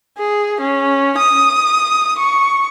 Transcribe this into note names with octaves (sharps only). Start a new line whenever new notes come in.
G#4
C#4
D#6
C#6